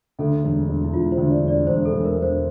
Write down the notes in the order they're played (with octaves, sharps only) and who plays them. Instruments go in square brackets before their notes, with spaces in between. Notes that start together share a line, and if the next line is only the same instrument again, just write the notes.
[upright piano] D2 [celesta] A4
[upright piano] E1
E1
[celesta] E4
[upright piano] E1 [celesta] F4
[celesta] C5
[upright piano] D2
[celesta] D5
[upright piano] E1
[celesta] D5
[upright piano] E1 [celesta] C5
[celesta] A4
[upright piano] E1
[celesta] A#4
[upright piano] E1
[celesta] C5